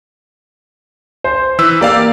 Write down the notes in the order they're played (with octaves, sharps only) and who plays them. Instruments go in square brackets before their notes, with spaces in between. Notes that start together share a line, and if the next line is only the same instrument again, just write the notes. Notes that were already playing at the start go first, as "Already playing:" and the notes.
[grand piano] C5
[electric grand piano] E3 B4 E6
[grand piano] A#3 [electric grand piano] G4 D5 F5